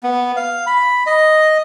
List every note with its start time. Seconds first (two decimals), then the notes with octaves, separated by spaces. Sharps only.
0.03 B3
0.36 F5
0.67 B5
1.07 D#5